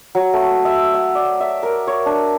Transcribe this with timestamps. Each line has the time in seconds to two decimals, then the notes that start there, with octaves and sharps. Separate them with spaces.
0.15 F#3
0.33 A3
0.65 E5
0.94 F#5
1.15 D5
1.40 E5
1.63 A#4
1.87 C#5
2.06 D4